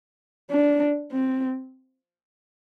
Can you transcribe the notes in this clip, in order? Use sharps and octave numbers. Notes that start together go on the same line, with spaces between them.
D4
C4